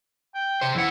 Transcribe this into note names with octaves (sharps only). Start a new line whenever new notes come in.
G5
C3 C5
F2 E3 E4 F#5